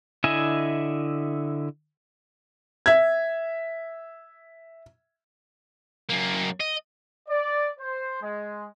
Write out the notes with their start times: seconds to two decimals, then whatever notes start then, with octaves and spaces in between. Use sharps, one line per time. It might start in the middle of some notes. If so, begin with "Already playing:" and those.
0.24 D3 E4 D#5 E5 G#5
2.86 E5 G#6
6.10 F#2 A#3
6.61 D#5
7.28 D5
7.79 C5
8.20 G#3